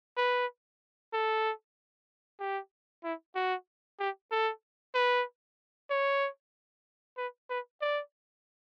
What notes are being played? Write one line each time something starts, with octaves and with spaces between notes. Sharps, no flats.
B4
A4
G4
E4
F#4
G4
A4
B4
C#5
B4
B4
D5